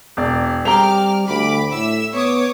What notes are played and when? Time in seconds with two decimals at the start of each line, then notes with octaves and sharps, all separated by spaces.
0.17 E1 D5
0.65 G3 C4 G4 A#5 D6 F6 F7
1.28 D2 B5 D6
1.72 A2 E5 E6
2.14 B3 C#5 D6 D#6